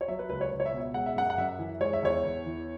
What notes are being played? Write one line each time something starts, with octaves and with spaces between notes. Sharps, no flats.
C#5
F#3 E5
B4
C#2 B4
C#5
C#2
C#5
E5
B2
E5
G#3 F#5
E5
F#2 F#5
F#5
F#2 E5
E3
G#3 C#5
E5
E2 C#5
E2
E3